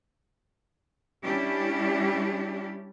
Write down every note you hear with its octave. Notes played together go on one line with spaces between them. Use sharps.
G3 C#4 D4 E4 G4